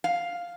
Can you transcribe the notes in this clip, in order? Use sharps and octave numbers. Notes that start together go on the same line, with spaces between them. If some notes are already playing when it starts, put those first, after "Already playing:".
F5